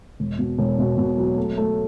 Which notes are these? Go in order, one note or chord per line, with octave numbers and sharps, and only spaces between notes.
E1
B2
E1
B2
B2
F#3
A3
A3